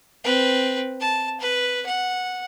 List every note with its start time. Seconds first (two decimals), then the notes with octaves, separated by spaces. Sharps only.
0.24 C4 B4
1.00 A5
1.41 B4
1.86 F#5